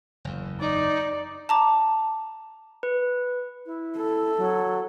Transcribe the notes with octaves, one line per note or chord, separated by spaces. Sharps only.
F#1 E2
D#4 D5
A5 A#5 D6
B4
E4
A4
F#3